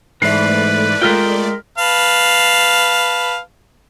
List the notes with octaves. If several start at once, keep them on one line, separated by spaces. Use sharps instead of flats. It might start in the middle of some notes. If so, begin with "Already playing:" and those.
G#2 E3 A3 B4 D5 C7
G#3 F4 A#4 G5 F6 B6
B4 F5 A5